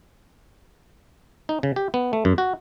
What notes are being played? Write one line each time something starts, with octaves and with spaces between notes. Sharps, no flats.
D#4
C#3
G4
B3
A3
F#2
F#4